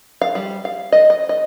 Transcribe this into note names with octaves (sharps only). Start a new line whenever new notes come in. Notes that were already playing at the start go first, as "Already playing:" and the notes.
F5
G3
F5
D#5
D#5
D#5